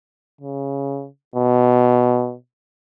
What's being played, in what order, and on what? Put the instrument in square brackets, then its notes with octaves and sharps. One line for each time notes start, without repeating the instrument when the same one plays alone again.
[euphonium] C#3
B2